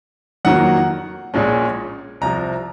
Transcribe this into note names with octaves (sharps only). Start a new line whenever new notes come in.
F2 D#3 F#3 A#3 F#5
A#1 A#2 G#3 C#4
C2 C3 F3 A#5